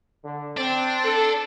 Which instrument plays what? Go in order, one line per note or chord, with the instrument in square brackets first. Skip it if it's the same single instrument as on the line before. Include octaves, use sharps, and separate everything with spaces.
[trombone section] D3
[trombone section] C4 [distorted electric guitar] D4
[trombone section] A4